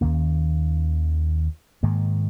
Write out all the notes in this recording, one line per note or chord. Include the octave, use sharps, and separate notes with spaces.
D#2 D#3 A#3 C#4
G#2 D#3 A#3